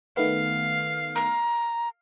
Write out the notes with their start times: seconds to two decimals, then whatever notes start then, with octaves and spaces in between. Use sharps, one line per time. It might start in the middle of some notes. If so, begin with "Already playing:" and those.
0.17 D#3 A3 B3 F5
1.15 A#5